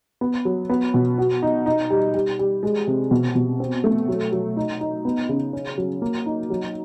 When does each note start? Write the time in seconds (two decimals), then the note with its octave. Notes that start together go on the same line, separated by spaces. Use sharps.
0.21 B3
0.45 F#3
0.70 B3
0.94 B2
1.18 F#4
1.42 D#4
1.66 D#4
1.90 G3
2.14 G3
2.39 G3
2.63 G#3
2.87 C3
3.11 B2
3.35 B2
3.60 C4
3.84 A3
4.08 F#3
4.32 F#3
4.57 D#4
4.81 D#4
5.05 B3
5.29 C#3
5.53 C#4
5.78 F#3
6.02 A#3
6.26 D#4
6.50 F#3